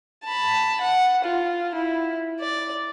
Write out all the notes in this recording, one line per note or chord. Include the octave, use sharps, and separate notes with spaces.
A5 B5
F#5
F4
E4
D5